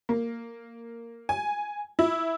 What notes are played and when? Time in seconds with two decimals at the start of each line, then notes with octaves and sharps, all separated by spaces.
0.09 A#3
1.29 G#5
1.99 E4